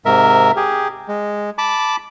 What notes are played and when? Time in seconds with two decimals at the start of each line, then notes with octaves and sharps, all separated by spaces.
0.05 G#2 C3 A#4 E5
0.57 G4 G#4
1.08 G#3
1.58 A5 B5 D6